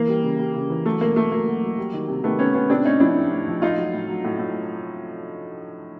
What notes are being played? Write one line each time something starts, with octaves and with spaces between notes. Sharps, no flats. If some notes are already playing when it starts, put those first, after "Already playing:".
Already playing: E3 A#3
G3
C#3
G3
C#3
E3
F#3 A3
B2 A#3
F#3 A3
F#3 A#3
F#3
F#3
G3
D#3
C3
D#3 A3 B3
C3 B3 C#4
C3 B3 C#4
A2 C4 D4
A2 C#4 D#4
F3 D4 E4
A2
A2
F3
A2 D#4 F4
F#3
A2
F#3
A2
A2